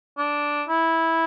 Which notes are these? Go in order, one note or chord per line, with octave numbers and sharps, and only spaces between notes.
D4
E4